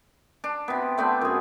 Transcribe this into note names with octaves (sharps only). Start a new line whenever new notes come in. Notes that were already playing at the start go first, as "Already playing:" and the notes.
D4
C3 B3
A3 B3 C4 D4
F#2 G#4